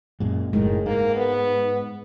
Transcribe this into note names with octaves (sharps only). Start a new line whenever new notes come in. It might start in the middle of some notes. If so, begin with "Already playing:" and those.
F#2 A#2 G#3
F#1 A2 D#3 G#3
G#2 A#3
B3